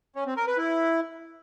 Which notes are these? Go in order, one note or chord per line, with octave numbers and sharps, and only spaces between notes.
C#4
C4
A#4
B4
E4